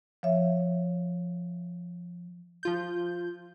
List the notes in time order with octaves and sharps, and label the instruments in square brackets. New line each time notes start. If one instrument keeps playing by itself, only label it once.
[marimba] F3 C#5 E5
[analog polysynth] F3 F4 G6